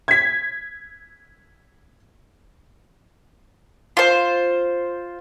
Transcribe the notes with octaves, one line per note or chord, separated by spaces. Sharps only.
G#6 B6
F4 C5